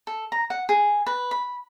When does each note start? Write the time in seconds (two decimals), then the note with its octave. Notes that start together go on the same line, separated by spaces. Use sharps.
0.07 A4
0.32 A#5
0.50 F#5
0.69 G#4
1.06 B4
1.31 B5